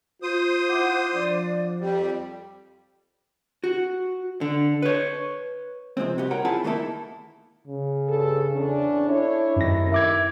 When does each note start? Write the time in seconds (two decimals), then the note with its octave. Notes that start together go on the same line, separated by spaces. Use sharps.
0.22 F4 C5 D#6
0.70 E4 F#5 D6
1.14 F3 D4 D5
1.81 F2 G3 G4
3.64 F#4
4.41 D3
4.82 B4 C#5
5.97 C3 F3 G#3 C4
6.18 C2 F#4 G4
6.31 A#4 C#5 F#5 G5 A#5
6.45 C4 E4 F4 G#4 G#5 A5
6.64 D#3 A3 A#3 D4 E4 A4
7.68 C#3
8.08 G2 A4
8.52 E2 C#4 D4
9.09 D4 E4 A4 C#5
9.56 F#2 A2 C3 D#3 A#6
9.92 E5 D6 G#6